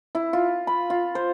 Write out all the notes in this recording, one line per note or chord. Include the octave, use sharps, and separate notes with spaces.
E4
F4
B5
F4
C5